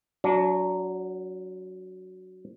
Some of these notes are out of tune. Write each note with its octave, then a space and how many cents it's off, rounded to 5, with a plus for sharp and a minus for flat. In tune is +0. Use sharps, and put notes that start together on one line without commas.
F#3 +0 D4 -35